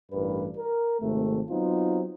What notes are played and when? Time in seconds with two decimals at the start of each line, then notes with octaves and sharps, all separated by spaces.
0.12 A1 G2 A#4 B4
0.57 A#4
1.00 G#1 C3 A3
1.49 F#3 B3 C4 D#4 F4